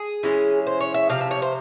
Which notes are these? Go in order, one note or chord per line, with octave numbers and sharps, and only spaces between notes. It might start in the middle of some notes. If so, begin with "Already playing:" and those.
Already playing: G#4
E3 G#3 C#4 E4
C5
C#5
E5
C3 F3 F5
E5
C#5
C5